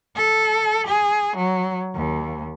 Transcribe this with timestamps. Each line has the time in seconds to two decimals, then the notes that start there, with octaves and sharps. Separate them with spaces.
0.15 A4
0.86 G#4
1.37 F#3
1.95 D#2